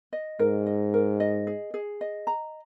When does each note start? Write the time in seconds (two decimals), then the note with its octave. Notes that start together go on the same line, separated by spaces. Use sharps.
0.13 D#5
0.39 G#2 A#4
0.66 D#5
0.94 A#4
1.20 D#5
1.47 G#4
1.74 G#4
2.01 D#5
2.27 A#5